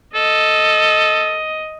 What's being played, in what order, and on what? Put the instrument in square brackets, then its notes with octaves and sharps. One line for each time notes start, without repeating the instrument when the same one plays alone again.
[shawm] A4 [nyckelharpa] D#5